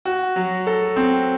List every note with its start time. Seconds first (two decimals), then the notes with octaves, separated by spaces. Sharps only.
0.05 F#4
0.36 F#3
0.67 A4
0.96 C4